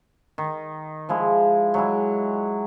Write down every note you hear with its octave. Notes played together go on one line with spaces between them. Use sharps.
D#3
F3 G#3 E4
F#3 G#3 E4